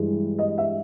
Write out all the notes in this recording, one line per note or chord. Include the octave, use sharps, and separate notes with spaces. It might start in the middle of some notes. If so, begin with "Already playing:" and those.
Already playing: G2 E3 G#3
D#5
E5